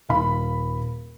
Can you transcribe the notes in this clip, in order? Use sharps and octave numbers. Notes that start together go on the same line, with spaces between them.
D#1 F5 B5